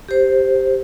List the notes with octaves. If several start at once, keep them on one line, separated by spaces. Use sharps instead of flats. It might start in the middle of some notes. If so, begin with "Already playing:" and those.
G4 C5